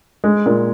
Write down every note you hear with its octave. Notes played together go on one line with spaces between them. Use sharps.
G#3
A#2